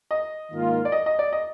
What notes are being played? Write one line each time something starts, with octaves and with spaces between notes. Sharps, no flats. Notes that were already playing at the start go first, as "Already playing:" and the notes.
D#5
G#2 D#3 A#3 F4 A#4
D5
D#5
D#5
D5
D#5